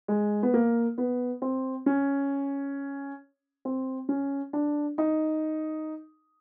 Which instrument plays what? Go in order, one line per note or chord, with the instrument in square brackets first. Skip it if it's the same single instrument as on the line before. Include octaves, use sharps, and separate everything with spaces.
[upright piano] G#3
B3
A#3
B3
C4
C#4
C4
C#4
D4
D#4